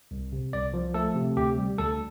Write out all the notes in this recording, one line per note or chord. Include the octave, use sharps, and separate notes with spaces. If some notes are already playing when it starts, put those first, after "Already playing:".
C2
C3
C2 D5
F3
A3 A4
C3
D2 G4
G3
D2 A4